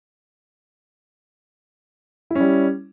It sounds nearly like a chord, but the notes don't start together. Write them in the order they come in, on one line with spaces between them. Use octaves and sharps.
E4 C#4 G3